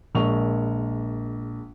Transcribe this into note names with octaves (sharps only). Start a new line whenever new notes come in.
A#1 G#3 A#4 C#6 F7